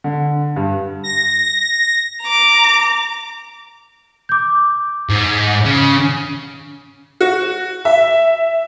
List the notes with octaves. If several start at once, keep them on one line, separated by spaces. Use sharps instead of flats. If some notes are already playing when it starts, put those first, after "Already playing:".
D3
G2
A#6
A#5 D6
D6 G6
G#2
C#3
F#4
E5